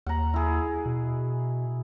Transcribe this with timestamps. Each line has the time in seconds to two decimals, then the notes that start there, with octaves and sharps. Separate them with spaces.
0.06 D#2 F#5 A#5
0.34 E4 G#4
0.86 B2